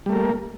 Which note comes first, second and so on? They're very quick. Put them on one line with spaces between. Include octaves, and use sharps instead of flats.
G3 A3 A#4 A#3